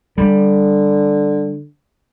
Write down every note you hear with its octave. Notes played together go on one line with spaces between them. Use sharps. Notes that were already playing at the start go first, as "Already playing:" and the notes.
D3 G3